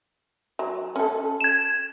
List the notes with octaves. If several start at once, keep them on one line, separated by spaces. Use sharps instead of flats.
F#3
C#4 A4
G#6 E7